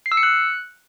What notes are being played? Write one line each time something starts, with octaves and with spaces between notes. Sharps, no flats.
C7
E6
C#7
F#6